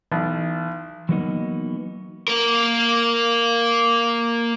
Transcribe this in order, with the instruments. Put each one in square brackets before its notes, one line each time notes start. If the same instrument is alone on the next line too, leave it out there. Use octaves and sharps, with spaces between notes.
[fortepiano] B1 [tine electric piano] E3
[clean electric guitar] E3 F#3 G3 A#3 B3 D#4
[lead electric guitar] A#3 A#4